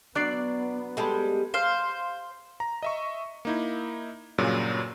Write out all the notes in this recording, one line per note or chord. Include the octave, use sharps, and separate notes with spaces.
F#3 B3 D4 D5 F#6 A6 C7
G3 G#3 A4 A5 B5
C5 F5
A#5
D#5 E5 C#6
A#3 D#4 E4
G2 A#2 C#3 F#3